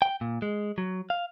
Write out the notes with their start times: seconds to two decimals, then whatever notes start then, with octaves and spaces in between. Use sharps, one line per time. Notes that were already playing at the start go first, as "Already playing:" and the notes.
0.02 G5
0.21 A#2
0.42 G#3
0.78 F#3
1.10 F5